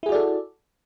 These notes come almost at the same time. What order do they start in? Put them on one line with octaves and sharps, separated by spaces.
E4 G#4 F#4 D5 A4